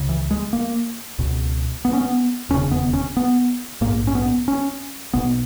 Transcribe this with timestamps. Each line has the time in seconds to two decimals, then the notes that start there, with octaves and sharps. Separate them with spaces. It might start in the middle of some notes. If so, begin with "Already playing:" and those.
Already playing: C#2 C#3
0.09 E3
0.31 G#3
0.53 A#3
1.19 C#2 B2
1.85 B3
1.93 C#4
2.01 B3
2.49 E1 D#2 C#3 C#4
2.71 B3
2.93 C#4
3.17 B3
3.81 A#1 G#2 A#3
4.07 C#4
4.15 B3
4.48 C#4
5.13 B1 B2 B3